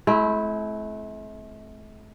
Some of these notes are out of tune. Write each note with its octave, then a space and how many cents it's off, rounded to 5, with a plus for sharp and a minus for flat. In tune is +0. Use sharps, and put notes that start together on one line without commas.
A3 -45 C4 +0 E4 +0